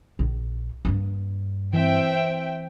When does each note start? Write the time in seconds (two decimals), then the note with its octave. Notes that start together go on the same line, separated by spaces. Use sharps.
0.19 A#1
0.85 G2 A#3
1.73 E3 C4 E5 G5